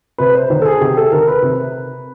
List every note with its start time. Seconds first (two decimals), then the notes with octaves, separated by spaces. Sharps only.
0.18 C3 B4
0.35 C5
0.50 D#3 C5
0.62 A4
0.65 G#4
0.81 C3 G4
0.97 A4
1.12 D#3 A#4
1.28 B4
1.42 C3